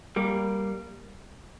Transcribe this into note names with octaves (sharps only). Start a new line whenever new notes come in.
G3 A#3